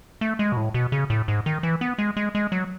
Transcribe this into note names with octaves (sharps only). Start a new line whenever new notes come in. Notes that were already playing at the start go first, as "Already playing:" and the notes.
A3
G#3
B2
A2
B2
C#3
A2
G#2
D#3
E3
B3
G#3
G#3
G#3
F#3